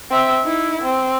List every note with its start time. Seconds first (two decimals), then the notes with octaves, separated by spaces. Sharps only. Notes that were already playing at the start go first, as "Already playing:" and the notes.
0.11 C4 E5
0.44 D#4 E4
0.82 C4